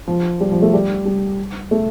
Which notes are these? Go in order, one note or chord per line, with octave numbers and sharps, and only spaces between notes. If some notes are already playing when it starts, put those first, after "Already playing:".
F3
G3
F3
A3
G3
G3
A3